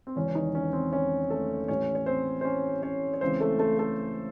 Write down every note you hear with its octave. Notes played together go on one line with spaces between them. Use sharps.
C4
E1 E2 C#3 E3 C#4
D#3 D#4
C#4
C4
C#4
A3 A4
A1 A2 E3 C#4 C#5
C#5
C4 C5
C5
C#4 C#5
C#4 C#5
C#5
C#2 C#3 E3 C4 C5
A3 A4
A3 A4
A3 A4